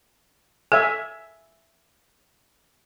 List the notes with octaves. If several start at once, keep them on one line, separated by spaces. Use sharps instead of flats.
A4 E5 G#5